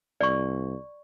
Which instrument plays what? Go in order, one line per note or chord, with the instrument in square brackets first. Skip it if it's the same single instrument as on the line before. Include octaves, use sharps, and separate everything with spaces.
[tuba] C2 [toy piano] D5 C#6